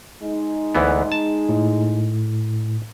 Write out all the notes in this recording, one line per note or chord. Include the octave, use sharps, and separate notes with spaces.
G#3 D#4
D2 E3 B3
A5
A2